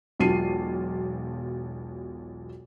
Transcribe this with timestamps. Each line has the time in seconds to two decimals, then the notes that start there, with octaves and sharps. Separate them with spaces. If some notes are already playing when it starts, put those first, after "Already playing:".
0.20 E1 B1 F4 A5 C7 D#7